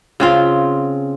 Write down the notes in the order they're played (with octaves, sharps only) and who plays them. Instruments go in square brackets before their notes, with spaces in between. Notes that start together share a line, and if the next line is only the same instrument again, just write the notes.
[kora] C#3 C4 F4